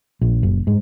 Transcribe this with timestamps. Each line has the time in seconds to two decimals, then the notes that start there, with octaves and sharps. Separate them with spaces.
0.21 A#1
0.43 F#1
0.67 G#2